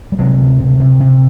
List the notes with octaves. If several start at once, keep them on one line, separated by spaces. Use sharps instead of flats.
G3
C3 F#3 G#3
D2
C3
C3
C3